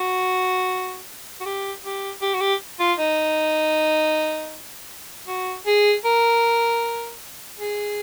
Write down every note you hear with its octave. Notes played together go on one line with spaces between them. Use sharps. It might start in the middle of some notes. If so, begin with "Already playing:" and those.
Already playing: F#4
F#4
G4
G4
G4
F#4
G4
F4
D#4
F#4
G#4
A#4
G#4